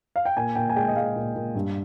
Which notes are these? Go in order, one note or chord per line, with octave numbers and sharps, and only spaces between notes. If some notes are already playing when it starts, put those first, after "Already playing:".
F5
G5
A#2 G#5
A#2 G5
G#5
G#3 G5
D#5
G#3 F5
A#2
A#2
G2